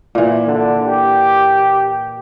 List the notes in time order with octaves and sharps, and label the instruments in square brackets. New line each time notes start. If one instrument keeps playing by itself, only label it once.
[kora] A#2 E3
[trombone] D3
G4